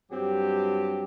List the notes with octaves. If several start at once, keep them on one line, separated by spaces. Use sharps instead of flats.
G2 F#3 C4 G4